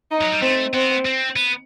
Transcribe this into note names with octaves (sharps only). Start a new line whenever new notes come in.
D#4
F#3
G3
A3 C4
B3 C4
C4
B3